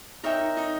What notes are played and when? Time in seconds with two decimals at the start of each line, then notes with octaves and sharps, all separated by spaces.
0.23 D#4 A#4 C#5 E5 G5
0.40 D#4
0.57 D#4